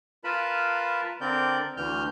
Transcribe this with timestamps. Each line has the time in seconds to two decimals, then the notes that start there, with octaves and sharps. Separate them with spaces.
0.24 F4 A#4 B4 A5 B5
1.21 D3 C4 A#4 D5 G6
1.77 D2 D3 E3 F6 G6